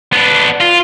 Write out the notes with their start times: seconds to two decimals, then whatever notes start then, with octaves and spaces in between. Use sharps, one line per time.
0.13 B3 D4
0.61 F4